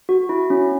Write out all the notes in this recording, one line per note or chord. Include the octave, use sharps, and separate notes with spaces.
F#4
E4
C#4